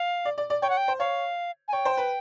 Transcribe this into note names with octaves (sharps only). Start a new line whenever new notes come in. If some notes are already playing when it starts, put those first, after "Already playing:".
Already playing: F5
D5
D5
D5
C#5 G5
F#5
G5
C5
C#5 F5
G#5
C#5 G5
C5
B4